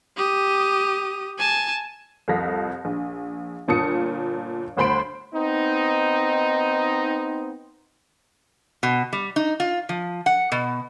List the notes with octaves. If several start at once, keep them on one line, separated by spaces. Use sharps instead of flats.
G4 D#6
G#5 A5
C2 F2 A4 F5 A#6 B6
A#1
G1 A#2 A5 D#6 C#7
G1 D2 C5 B5 C6 D7
B3 C4 D#4
B2
G3
D#4
F4
F3
F#5
B2